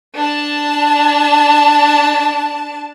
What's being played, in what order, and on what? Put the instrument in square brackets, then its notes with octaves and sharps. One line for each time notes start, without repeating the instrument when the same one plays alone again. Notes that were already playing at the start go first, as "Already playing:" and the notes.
[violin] D4 A5